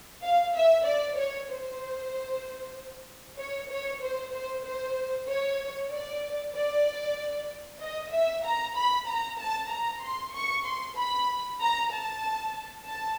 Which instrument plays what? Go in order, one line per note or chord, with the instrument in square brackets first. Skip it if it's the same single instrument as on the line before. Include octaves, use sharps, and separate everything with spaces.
[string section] F5
E5
D5
C#5
C5
C#5
C#5
C5
C5
C5
C#5
D5
D5
D#5
E5
A#5
B5
A#5
A5
A#5
C6
C#6
C6
B5
A#5
A5
A5